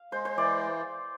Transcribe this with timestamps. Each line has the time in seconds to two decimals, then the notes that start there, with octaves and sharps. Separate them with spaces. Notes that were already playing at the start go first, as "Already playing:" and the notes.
Already playing: F5
0.12 G#3 C5
0.25 C5
0.37 E3 D5